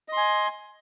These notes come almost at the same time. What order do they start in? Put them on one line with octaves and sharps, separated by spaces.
D#5 C6 G#5